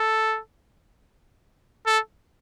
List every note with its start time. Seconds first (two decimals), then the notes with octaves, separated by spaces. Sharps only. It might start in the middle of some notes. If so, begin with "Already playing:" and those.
Already playing: A4
1.86 A4